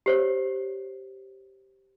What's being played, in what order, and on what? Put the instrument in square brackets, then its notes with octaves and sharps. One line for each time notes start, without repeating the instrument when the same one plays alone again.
[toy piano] G4 C5 C#5